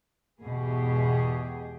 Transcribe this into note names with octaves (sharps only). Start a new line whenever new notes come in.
E2 G#2 B2 G4 G#4